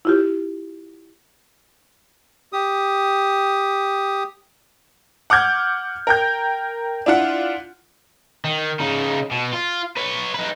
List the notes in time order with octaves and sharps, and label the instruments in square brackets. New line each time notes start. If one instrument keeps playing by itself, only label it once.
[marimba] E4 F4 G4
[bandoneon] G4 D#6
[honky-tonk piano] F#5 D6 F6 G6 G#6
A#4 G5 G6
D4 E4 F4 F#5
[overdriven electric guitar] D#3
C#3 D#4
B2
F4
B4 C#5
D#4 B4